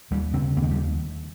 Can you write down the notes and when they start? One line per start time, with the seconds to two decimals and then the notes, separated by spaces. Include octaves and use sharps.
0.11 D#2 G3
0.33 C#3 C4
0.56 D#2 A#3
0.63 G#3
0.71 G3